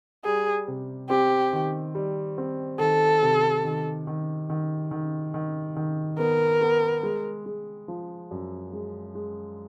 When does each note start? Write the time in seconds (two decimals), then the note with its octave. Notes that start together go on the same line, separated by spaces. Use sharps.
0.25 G3 G#4
0.68 C3
1.10 C4 G4
1.53 D#3
1.95 G3
2.38 C4
2.80 D#3 A4
3.22 C3
3.64 D#3
4.07 D#3
4.50 D#3
4.91 D#3
5.34 D#3
5.76 D#3
6.18 B3 A#4
6.61 B3
7.03 G#3
7.46 G#3
7.88 F3
8.31 F#2
8.73 G#3
9.15 G#3